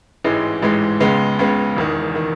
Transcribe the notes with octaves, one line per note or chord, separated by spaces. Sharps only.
A1 G#2 E3 G#3
A1 G#2 E3 G#3
C#2 C#3 G#3 B3
C#2 C#3 G#3 B3
E1 E2 D#3
D#3